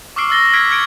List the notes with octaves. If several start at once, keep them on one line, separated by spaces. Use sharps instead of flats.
C#6 D6 E6 F6 C7 D7
E6 F6 A6 A#6 G7
E6 F6 G#6 B6 C7 D7
F6 G#6 C#7 D7